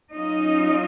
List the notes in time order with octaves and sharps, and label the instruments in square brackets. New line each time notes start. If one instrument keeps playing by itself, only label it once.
[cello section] F#3 C#4 D#4 F4 D#5